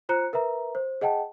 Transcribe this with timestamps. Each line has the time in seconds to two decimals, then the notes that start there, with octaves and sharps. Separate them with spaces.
0.09 F4 C5 A#5 F#6 C#7
0.33 A#4 B4 E5 A#5
0.75 C5
1.01 G#4 D#5 F#5 G5 A5